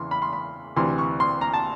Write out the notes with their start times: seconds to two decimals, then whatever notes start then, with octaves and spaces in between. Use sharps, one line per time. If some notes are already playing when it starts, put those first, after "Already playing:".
Already playing: E2 C#3 E3 C6
0.11 B5
0.22 C6
0.33 B5
0.76 D2 C3 E3 C6
0.98 C#6
1.20 C6
1.41 A#5
1.53 A5